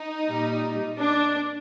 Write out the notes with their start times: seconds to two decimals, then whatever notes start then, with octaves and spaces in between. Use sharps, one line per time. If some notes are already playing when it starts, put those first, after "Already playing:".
Already playing: D#4
0.27 A#2 G3
0.99 D4